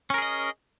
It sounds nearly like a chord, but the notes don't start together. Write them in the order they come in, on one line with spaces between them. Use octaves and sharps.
C#4 A#4 G#4 D#5